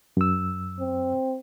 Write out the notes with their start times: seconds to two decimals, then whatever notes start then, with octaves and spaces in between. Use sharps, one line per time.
0.17 F#2 E6
0.79 C4